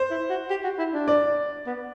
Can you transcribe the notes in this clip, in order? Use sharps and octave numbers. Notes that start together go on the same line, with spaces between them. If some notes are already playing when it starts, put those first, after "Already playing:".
Already playing: C5
E4
F#4
G4
F#4
E4
D4
D5
B3